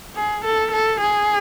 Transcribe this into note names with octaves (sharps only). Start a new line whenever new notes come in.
G#4
A4
A4
G#4